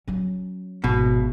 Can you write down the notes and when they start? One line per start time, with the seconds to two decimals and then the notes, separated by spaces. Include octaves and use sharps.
0.08 F#3 C#4
0.84 G#1 B2